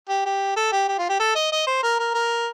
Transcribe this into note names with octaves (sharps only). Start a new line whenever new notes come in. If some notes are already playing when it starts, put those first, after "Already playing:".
G4
G4
A4
G4
G4
F4
G4
A4
D#5
D#5
C5
A#4
A#4
A#4